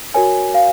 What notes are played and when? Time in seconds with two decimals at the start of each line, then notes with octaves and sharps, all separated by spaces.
0.14 F#4 A#4 C#5 G#5
0.54 F5